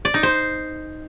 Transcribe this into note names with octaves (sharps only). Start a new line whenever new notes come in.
D5
D#4
C5